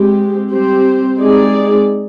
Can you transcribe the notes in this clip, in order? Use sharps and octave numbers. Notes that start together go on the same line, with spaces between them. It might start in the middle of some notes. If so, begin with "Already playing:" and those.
Already playing: G#3 C4 G4
G3 C4 G4 C5
G#3 C4 D#4 G#4 D5